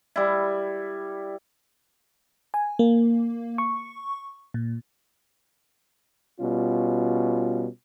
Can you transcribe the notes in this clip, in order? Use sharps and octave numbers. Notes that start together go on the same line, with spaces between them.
G3 E4
G#5
A#3
C#6
A#2
B2 G3 C#4 F4